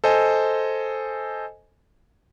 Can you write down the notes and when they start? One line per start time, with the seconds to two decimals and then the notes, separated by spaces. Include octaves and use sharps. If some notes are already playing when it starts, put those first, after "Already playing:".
0.04 A4 C5 D#5 G#5